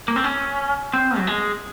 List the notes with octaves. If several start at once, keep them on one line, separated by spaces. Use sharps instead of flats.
A#3
C4
C#4
C4
F#3
G#3